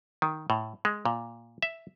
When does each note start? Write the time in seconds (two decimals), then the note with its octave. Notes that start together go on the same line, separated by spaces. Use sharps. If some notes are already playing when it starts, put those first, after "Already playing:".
0.22 D#3
0.50 A2
0.85 G#3
1.05 A#2
1.62 E5